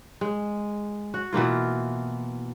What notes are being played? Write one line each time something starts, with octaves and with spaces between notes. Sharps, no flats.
G#3
F#4
B2 E3 A#3 F4